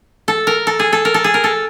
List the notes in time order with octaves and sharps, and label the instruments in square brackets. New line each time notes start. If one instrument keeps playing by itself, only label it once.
[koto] A4
A#4
A4
G#4
A4
A#4
A4
G#4
A#4
A4